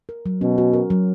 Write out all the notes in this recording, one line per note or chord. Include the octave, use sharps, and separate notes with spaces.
A#4
F#3
B2 C#4
F#4
A#4
F#3